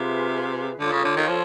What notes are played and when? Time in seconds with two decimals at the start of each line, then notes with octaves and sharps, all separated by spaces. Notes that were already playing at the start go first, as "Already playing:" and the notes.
Already playing: C3 F4 G#4 B4 E5
0.79 D3 F4 A4 C#5
0.92 C#3
1.05 D3
1.17 D#3
1.29 F3